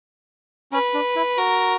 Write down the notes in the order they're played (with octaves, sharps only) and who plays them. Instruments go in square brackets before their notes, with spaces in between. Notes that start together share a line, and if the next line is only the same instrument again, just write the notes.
[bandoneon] C#4 [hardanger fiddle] B4
[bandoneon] D4
E4
[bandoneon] F#4 [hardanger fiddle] A#4